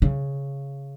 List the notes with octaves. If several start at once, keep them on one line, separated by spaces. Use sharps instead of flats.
C#3